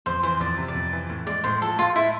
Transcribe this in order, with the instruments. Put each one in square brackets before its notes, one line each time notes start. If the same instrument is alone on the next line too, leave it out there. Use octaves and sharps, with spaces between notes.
[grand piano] F2 [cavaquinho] C5
[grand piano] E3 [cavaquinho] C5
[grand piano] F2 [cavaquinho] D5
[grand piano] C3
[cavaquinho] D5
[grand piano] F2
E3
A2
[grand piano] G#3 [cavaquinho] D5
[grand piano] A2 [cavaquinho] C5
[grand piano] F3 [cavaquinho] A4
[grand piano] A2 [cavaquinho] F4
[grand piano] G#3 [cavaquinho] E4